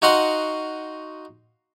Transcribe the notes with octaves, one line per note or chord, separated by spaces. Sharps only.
D#4 F#4 F5 F#5 C6 D#6